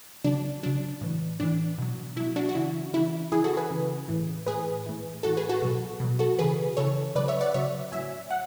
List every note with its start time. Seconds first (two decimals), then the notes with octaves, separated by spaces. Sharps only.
0.24 C#3 F#3 D4
0.63 C#3 F#3 D4
1.01 A2 E3
1.40 A2 E3 D4
1.78 B2 F#3
2.16 B2 F#3 E4
2.36 D4 F#4
2.49 F#4
2.55 C#3 E3 E4
2.93 C#3 E3 E4
3.32 C#3 E3 E4 G#4
3.44 F#4 A4
3.57 G#4 B4
3.70 C#3 E3
4.08 A2 E3
4.46 A2 E3 G#4 B4
4.86 A2 E3
5.23 A2 E3 F#4 A4
5.37 G#4 B4
5.49 F#4 A4
5.62 B2 F#3
6.00 B2 F#3
6.19 F#4 A4
6.39 C#3 E3 G#4 B4
6.77 C#3 E3 A4 C#5
7.15 C#3 F#3 B4 D5
7.28 C#5 E5
7.41 D5 F#5
7.54 C#3 F#3 C#5 E5
7.92 A2 F#3 E5 G#5
8.30 F#5